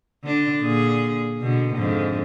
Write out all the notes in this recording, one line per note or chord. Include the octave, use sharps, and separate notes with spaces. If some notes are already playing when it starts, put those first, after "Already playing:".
D3 D4
A#2 D3 G#4
B2 D3
F2 G#2 D3